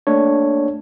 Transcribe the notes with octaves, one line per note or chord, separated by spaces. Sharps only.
A3 A#3 D4 C#5